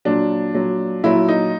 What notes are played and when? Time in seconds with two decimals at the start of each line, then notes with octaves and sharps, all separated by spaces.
0.05 A#2 F#3 D4
0.54 A#2 F#3
1.03 A#2 F#3 E4
1.28 D#4